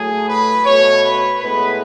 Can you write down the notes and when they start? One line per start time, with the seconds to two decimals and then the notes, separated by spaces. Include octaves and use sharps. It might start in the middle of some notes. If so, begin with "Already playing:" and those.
Already playing: A2 F#3 A3 G#4
0.28 B4
0.65 B2 A3 C#5
1.03 B4
1.40 A2 G#3 B3 B4